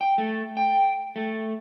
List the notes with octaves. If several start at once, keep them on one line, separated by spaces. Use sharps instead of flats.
G5
A3
G5
A3